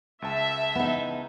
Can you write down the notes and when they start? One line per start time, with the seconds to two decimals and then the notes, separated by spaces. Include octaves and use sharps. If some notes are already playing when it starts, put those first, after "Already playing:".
0.22 C#2 E5 A5
0.75 B3 D#4